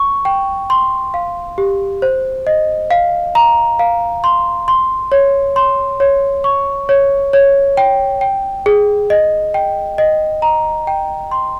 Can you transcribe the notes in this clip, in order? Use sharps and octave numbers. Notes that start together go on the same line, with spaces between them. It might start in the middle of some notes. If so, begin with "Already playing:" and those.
Already playing: C#6
G5
C6
F5
G4
C5
D#5
F5
A#5
F5
C6
C6
C#5
C6
C#5
C#6
C#5
C#5
G5
G5
G#4
D#5
G5
D#5
A#5
G5
C6